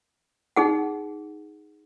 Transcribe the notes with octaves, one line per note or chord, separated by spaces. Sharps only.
D#4 G#4 F#5